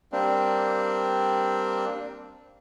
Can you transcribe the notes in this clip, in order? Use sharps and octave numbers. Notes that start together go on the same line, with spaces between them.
G3 A#3 C4 D4